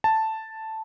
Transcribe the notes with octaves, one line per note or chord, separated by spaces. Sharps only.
A5